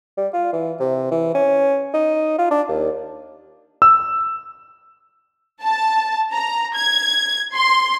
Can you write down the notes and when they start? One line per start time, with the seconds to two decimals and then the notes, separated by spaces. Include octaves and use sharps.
0.17 G3
0.33 F4
0.53 E3
0.80 C3
1.11 E3
1.35 C#4
1.94 D#4
2.38 F4
2.51 D4
2.68 D#2
3.82 E6
5.63 A5
6.33 A#5
6.77 G#6
7.54 C6